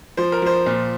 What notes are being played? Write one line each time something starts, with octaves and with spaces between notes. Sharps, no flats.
F3 C5
A#4
F3 C5
A#2